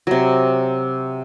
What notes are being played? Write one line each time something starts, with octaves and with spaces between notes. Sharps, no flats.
C3 F#3